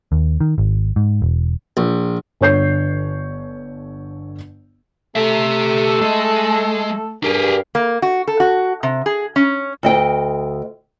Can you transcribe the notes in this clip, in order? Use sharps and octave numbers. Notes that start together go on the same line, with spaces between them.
D#2
D#3
G#1
G#2
E1
A#1
G1 D3 C#5 G6 C7
A3 G4 A4 E5
G#3
G2 G4 G#4 A#4
A#3
F#4
A4
F#4
C3
G#4
C#4
D2 D#5 G5